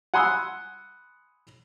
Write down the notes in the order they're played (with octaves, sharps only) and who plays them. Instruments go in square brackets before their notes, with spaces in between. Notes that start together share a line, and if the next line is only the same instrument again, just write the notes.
[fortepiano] F#5 G#5 B5 C6 D#6 E6